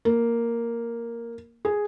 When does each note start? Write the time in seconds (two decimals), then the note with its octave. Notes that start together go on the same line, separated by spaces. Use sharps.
0.05 A#3
1.65 G#4